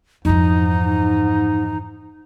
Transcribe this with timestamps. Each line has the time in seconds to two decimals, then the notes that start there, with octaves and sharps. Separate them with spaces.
0.25 F2 G#2 E3 D#4